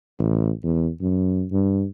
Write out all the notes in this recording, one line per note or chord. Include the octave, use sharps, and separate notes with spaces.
A1
E2
F#2
G2